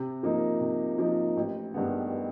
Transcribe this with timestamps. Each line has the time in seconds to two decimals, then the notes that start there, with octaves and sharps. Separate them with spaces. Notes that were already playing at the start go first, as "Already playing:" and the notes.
Already playing: C3
0.23 F3 A#3 D#4
0.60 C3
0.98 F3 A#3 D#4
1.37 A1
1.74 G2 D#3 G#3 B3